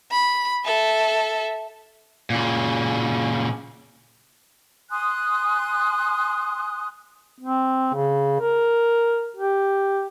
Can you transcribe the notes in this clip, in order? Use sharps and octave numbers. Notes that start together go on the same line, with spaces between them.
B5
A4 E5
A#2 C#3
G#5 C6 D#6 F#6
C4
C#3
A#4
G4